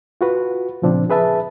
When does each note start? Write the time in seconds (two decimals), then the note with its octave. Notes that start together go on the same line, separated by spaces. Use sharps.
0.21 F4 F#4 B4
0.82 A#2 C#3 F3 C4 D4
1.10 G#4 B4 E5 A5